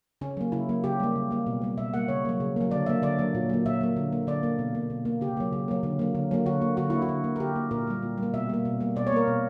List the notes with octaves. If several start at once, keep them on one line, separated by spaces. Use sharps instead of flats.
C#3 C#4
F#3 A#3
C#3 E4
F#3 A#3
C#3 G4
G3 A#3
C#3
G3 A#3
B2
G3 A#3
B2 E5
G3 A#3 F#5
C#3 C#5
F#3 A#3
C#3
F#3 A#3
D3 D5
F#3 A#3 E5
D3 D5
F#3 A#3
A#2
F#3 A#3
A#2 E5
F#3 A#3
D3
A#3
D3 D5
A#3
B2
A#3
B2
A#3
C#3 G4
F#3 A#3
C#3
F#3 A#3
D3
F#3 A#3
D3
F#3 A#3
D3 F#4
A#3
D3 F#4
A#3 E4
F#4
D3
A#3
A#4
D3 G4
A#3
A#2 A#4
G3 A#3
A#2
G3
A#3
B2 E5
G3 A#3
B2
G3 A#3
B2 D5
C#5
A#3 A#4
B2